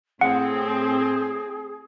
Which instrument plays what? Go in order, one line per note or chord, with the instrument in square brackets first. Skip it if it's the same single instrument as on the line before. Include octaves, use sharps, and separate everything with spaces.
[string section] A2 C4 [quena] G#4 [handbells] F#5